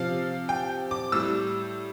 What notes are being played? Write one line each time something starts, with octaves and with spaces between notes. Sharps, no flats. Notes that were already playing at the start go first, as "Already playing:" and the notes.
Already playing: C3 F3 F5
G5
D6
A2 G3 E6